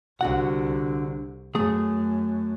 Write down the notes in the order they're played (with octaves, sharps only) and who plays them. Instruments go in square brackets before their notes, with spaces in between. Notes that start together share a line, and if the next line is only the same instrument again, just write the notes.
[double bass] C2 [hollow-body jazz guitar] D3 F#4 F#5
[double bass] F#2 [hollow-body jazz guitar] A3 G#4